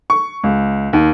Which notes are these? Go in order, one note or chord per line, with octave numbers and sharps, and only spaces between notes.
C#6
C#2
D#2